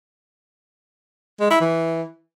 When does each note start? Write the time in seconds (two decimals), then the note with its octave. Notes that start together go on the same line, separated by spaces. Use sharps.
1.40 G#3
1.50 E4
1.61 E3